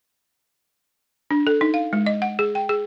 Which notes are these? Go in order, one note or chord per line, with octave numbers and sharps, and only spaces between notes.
D4
A4
D#4
F5
G#3
D#5
F#5
G#4
G5
G#4